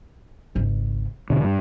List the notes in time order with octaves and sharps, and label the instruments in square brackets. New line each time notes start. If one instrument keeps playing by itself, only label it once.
[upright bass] G#1 C#2
[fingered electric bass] E1 B2 D3 [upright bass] F4
[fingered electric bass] G2 G3